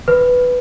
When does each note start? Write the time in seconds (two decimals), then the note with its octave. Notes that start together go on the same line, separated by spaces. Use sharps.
0.08 B4